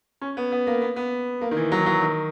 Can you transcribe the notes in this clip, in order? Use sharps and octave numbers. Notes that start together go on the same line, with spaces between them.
C#4
B3
B3
A#3
B3
B3
A#3
D#3
E3
F#3
E3
F#3
D#3